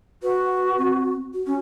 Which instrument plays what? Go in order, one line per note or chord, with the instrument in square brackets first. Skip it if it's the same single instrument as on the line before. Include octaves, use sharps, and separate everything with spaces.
[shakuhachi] F#4 [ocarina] B4
[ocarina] C4
F#4
[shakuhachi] C#4